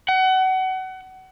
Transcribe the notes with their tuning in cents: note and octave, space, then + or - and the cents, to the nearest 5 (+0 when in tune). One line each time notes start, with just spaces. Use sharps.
F#5 +30